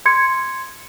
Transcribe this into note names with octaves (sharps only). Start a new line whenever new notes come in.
C6 G#6 C#7